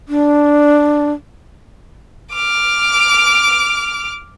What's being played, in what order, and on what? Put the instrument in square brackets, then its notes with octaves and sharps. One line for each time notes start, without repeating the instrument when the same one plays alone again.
[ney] D4
[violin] D6 F6